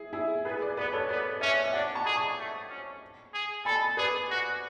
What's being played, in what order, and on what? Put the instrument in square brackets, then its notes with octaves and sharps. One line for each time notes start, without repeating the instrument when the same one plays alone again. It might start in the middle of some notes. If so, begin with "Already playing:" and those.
Already playing: [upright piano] E4 G#4
E4 G#4
[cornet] B3 [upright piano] G#4 B4
[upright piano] B4 D5
[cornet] B3 [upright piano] B4 D5
[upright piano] A4 C#5
[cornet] B3 [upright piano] B4 D5
[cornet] C#4 [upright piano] C#5 E5
[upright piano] E5
[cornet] D4 [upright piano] D5 F#5
[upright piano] A5 C#6
[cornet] G#4
[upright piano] A5 C#6
[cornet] A3
C#4
G#4
[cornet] A4 [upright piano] G#5 B5
[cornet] G#4 [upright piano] B4 D5
[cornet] F#4